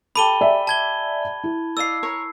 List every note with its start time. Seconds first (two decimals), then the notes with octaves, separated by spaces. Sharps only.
0.16 G4 A4 B5 D6 D#7 G7
0.41 D5 E5 G#5
0.67 A5 G#6 G7
1.44 E4
1.77 D5 D#5 F5 E6 C7
2.03 A#4 C#5 C#6